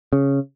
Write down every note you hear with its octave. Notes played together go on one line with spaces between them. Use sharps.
C#3